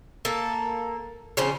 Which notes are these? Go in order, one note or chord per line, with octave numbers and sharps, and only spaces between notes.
A#3 A4
C#3 F3 C4 C#4